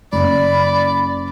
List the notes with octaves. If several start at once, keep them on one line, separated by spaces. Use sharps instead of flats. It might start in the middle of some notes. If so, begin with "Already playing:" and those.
F#1 D5 B5